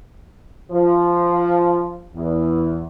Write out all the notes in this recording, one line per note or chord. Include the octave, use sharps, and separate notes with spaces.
F3
E2